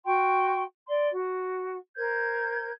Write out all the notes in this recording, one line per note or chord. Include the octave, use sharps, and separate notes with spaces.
F#4 G5 C6 C#6
D5 C6
F#4
A#4 C5 G6 G#6